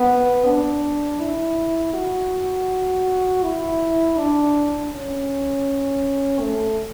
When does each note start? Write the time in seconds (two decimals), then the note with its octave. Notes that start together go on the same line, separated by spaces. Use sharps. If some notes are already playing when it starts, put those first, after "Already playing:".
Already playing: B3
0.46 D4
1.20 E4
1.94 F#4
3.44 E4
4.17 D4
4.92 C#4
6.40 A3